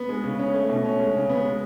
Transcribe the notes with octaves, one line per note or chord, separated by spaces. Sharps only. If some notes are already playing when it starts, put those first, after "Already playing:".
Already playing: B3
G#3
C#3
C#4
A3
B2
C#4
G#3
C#3
B3
G#3